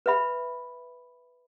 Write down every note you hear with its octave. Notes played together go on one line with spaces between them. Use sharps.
B4 E5 B5